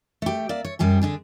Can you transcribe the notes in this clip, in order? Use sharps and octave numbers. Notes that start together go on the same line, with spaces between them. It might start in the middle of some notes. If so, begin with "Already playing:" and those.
A3 G4
A#3 D5 E5
C#5
F#2 G3 G4 G#4
D3 D4 G#4